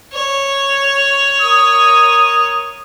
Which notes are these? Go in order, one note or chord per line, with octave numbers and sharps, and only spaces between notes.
C#5
A#4 D#6